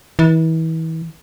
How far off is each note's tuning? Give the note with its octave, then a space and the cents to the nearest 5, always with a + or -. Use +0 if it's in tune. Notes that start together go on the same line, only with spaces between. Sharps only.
E3 -35